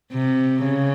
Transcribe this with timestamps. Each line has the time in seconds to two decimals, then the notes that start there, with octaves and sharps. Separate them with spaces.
0.13 C3
0.63 C#3